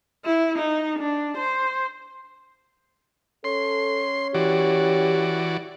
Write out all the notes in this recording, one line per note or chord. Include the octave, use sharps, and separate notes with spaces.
E4
D#4
D4
C5
C#4 A4 C6
E3 F#4 G4 D5